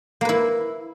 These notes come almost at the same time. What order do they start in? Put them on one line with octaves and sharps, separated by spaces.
A#3 B4 E4